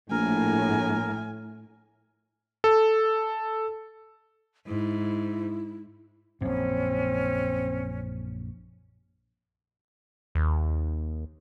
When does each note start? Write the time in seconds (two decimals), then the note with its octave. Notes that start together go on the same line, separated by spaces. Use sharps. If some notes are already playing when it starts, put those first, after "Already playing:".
0.11 A#1 A2 A#4 G#5
2.64 A4
4.67 G#2 E4
6.41 A#1 F#2 C4 C#4
10.35 D#2